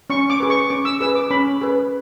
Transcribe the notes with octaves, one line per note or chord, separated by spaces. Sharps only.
C#4 C#6
D6
G#4 B4
C#6
C#4 D6
E6
G#4 B4 E6
D6
C#4 B5
G#4 B4